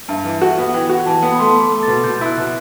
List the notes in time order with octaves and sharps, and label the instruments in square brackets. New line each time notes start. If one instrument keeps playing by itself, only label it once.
[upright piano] G2 [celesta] E5
[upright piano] E3 [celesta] E5
[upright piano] F#4 [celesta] E5
[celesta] F#5
[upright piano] B3
[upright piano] E3 [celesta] G5
[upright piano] F#4
[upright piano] E3 [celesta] A5
[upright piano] B3
[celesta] B5
[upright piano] A3 [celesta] C6
[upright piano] A3
[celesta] D6
[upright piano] A3
[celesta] A6
[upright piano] B2
[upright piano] B2 [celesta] G6
[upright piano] E4 [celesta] F#6
[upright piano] B2